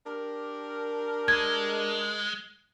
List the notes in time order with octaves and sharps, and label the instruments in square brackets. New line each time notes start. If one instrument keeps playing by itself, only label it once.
[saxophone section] D4 G4 A#4
[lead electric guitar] G#3 [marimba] G#6